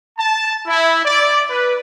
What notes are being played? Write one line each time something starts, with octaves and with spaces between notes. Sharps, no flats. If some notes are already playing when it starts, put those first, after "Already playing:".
A5
E4
D5
B4